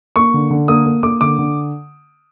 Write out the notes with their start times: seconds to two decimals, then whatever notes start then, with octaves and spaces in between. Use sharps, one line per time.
0.16 A#3 C#6
0.34 D3
0.51 D3
0.68 A#3 D#6
0.86 A#3
1.03 A#3 D6
1.21 D3 D6
1.39 D3